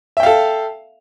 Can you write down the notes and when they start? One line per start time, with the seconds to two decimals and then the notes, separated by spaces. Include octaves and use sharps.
0.17 E5
0.20 G5
0.23 F5
0.26 A4